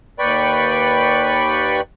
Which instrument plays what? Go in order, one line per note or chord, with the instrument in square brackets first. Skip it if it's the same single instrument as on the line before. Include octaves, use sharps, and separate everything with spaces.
[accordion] D#2 B4 D5 G5 B5 C#6